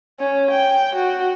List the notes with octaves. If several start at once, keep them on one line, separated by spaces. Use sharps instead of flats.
C#4
G5
F#4